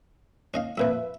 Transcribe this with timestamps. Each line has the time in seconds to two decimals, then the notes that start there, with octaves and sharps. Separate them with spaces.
0.54 C#4 D#5 F5
0.78 F2 A#2 F3 B4 E5